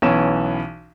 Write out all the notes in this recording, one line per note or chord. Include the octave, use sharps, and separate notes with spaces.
B1 E3 B3 C#4 E7